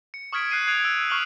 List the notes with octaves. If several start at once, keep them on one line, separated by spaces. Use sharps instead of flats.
C#7
C#6 D#6 F6 G#6 B6 D7
F#6 C7 D#7
D#6 G#6 D7 F7
E6 D7
C#6 F6 C7 F7 F#7